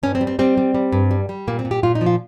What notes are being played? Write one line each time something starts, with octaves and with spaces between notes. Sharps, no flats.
G2 C#4
C4
G3
C4
G3 C4
G3
G3
G2
G3
G3
A#2 A#3
C4
A#2
G4
A#2 F4
D#4
F3
F4